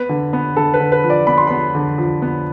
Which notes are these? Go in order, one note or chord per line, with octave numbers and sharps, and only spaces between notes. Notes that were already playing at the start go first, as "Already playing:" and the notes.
Already playing: B3 B4
D3
B3
D3 A4
B4
D3
B4
F3
D5
B3 B5
C6
B3 B5
D3
F3
B3